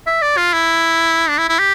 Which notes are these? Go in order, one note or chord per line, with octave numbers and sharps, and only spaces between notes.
E5
D5
F4
E4
D4
E4
E4
G4